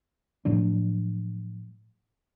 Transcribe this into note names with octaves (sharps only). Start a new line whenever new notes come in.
A2 F3 F#3 D4